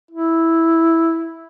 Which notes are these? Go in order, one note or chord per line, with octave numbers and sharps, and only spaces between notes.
E4